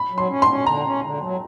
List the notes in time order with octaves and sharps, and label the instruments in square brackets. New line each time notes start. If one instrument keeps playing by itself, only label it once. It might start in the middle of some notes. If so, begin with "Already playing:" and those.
Already playing: [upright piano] B5
[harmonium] F#3
[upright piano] C6
[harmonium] C#4
[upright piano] C6
[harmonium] C#4
[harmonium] D3 [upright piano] A#5
[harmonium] C#4
D3
F#3